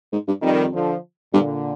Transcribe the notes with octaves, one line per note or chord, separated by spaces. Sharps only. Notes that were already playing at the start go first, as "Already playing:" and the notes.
G#2
G2
F2 D#3 G3
D3 F3
G2 A#2 D3